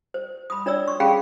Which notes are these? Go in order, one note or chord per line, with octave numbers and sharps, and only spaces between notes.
C5
B5 D#6
D4 C#5 D5 E6
C#6
C#4 G#4 F5 G5 B5 C#6